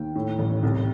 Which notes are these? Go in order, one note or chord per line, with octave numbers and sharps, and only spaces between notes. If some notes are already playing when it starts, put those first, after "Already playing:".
Already playing: D#2 G5
A2
A1
C2